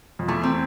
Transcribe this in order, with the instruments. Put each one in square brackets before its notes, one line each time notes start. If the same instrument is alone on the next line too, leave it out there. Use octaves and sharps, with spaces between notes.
[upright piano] F2
[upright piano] E2 [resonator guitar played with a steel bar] A3
[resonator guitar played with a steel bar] C4